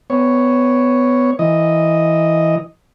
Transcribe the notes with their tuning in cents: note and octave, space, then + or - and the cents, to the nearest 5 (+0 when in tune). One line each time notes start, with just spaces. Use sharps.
B3 +20 C#5 +0
E3 +0 D#5 +0